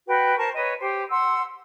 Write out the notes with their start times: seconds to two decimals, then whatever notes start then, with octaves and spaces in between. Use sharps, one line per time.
0.07 F#4 B4 G5
0.37 A#4 C5 A5 C#6
0.54 B4 C#5 D#5
0.79 G4 C5
1.09 F#5 C6 E6